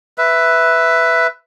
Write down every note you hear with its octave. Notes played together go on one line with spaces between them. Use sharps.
B4 E5